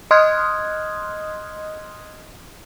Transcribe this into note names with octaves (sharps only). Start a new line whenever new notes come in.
D#5 C6 D#6 F6 F#6 G#6